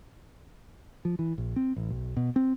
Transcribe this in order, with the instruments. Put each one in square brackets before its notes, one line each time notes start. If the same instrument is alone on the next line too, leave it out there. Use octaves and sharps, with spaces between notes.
[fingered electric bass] F3
E3
A#1
C4
A1
B1
B2
C4